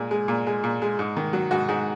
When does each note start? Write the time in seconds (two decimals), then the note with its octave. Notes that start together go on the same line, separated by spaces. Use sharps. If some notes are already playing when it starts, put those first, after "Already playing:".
Already playing: A#2 G#3
0.11 G#3
0.28 A#2
0.47 G#3
0.64 A#2
0.82 G#3
0.99 G#2
1.16 D#3
1.33 F#3
1.51 G#2 F#4
1.68 G#2